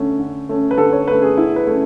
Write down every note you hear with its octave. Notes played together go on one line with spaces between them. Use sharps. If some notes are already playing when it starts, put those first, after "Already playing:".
Already playing: D3 A3 C#4
D3
A3 C#4
B4
D3 A4
C#5
A3 C#4 B4
G#4
D3 E4
B4
A3 C#4